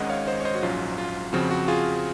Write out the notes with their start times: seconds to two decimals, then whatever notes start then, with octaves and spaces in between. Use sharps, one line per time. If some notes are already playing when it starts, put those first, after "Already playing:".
Already playing: G#1 G#2 D#3 G#3 C#4 D#5 F#5
0.10 C#5 F5
0.27 C5 D#5
0.40 C#5
0.45 C5 D#5
0.55 F#4
0.63 A#1 G#2 F#3 C#4 F4
0.98 F4
1.33 F2 C#3 F3 C4 F#4
1.51 F#4
1.68 F4 G#4